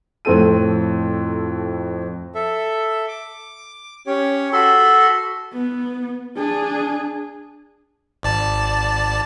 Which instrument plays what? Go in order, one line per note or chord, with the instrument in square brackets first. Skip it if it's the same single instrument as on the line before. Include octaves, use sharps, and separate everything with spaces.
[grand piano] F2 A2 C4 A4 D#7
[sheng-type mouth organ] A4 E5
D6
C#4 G4 C#5
[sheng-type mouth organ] F#4 B5 C6 [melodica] A4
[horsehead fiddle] B3
D4 G#4
[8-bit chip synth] G#1 D5 A5